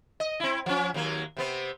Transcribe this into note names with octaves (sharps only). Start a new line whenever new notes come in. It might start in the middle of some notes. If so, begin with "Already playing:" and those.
D#5
C4 E4
F3 C#4
D#2 F#3 A#3
C3 B3 C4